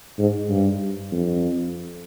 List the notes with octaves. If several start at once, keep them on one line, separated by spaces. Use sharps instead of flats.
G#2
G2
F2